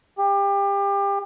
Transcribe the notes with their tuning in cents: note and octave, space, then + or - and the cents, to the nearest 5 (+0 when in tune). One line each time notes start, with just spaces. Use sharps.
G4 +30